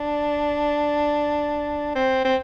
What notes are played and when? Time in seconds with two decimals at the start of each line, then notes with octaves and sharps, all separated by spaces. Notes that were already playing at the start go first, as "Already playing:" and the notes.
Already playing: D4
1.95 C4
2.25 C4